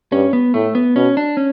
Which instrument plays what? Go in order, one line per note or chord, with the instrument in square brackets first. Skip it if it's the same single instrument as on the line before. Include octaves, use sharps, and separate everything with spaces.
[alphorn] G2 [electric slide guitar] C#4
[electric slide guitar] B3
[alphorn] A2 [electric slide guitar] A3
[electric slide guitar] B3
[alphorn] B2 [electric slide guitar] C#4
[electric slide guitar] D4
C#4